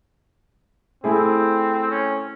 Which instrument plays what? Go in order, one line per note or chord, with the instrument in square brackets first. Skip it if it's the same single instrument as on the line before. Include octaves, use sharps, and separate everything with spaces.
[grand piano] A3 E4 G#4 [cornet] C4
[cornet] C#4